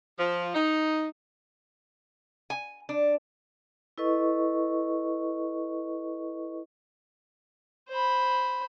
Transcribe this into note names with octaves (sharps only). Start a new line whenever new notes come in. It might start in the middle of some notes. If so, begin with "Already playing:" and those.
F3
D#4
G#5
D4
E4 A4 B4 D#5 C#6
C5 B5